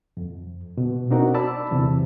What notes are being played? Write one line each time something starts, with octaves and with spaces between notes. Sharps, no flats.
F2
B2
C4 D4 D#4 F#4 A#4
D5 A5 B5 E6
E2 C3 E3